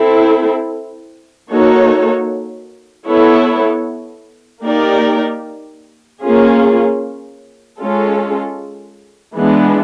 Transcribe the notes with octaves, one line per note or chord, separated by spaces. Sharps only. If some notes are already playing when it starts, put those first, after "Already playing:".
Already playing: C4 E4 A4
A#3 D#4 F#4 A4 C#5
B3 E4 A4 C#5
A#3 D#4 G4 A#4 D5
A#3 C#4 F4 G#4
G#3 C#4 F4 A4
E3 G#3 B3 D4